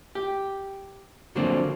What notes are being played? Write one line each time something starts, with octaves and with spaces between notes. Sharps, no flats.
G4
D3 F3 F#3 A#3 C4 D4